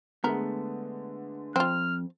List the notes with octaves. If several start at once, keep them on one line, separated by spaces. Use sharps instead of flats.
D3 G#3 A3 B3 A#4
F2 C4 F4 F6